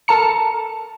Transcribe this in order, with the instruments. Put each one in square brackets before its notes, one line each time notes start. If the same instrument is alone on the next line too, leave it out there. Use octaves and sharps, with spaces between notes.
[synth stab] A4 A#4 A5 A#5 C#7